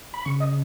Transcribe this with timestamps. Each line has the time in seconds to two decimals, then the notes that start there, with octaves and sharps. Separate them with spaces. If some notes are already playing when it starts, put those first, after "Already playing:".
0.14 B5
0.25 C#3 C#6
0.40 D#5